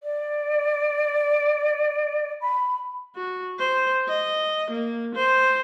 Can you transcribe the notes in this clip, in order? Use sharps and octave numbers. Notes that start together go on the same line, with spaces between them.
D5
B5
F#4
C5
D#5
A#3
C5